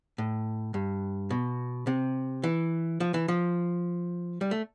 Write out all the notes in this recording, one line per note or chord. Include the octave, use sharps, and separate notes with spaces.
A2
G2
B2
C3
E3
F3
E3
F3
G3
A3